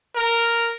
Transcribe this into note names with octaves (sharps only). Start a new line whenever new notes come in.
A#4